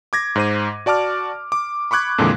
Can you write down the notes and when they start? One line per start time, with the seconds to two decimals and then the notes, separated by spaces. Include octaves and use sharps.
0.13 D6 G#6 A#6
0.36 G#2 C5 D#7
0.86 F#4 D5 A5 D6 F6
1.52 D6
1.91 B5 C#6 D6 F#6 G#6
2.18 F2 A#2 D3 E3 G#3